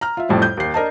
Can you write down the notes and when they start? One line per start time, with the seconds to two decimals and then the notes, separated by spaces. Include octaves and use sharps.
0.01 A#5 F6
0.17 F4 E5
0.29 F2 A2 G3
0.42 G6
0.57 D#2 C7
0.74 D4 A#4 D#5 A5